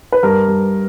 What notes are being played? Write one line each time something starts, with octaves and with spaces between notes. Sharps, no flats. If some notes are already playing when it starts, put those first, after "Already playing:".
B4
G2 A#4
G2